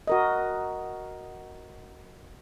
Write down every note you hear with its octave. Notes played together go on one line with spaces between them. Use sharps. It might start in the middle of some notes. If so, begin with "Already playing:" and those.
F#4 A#4 D#5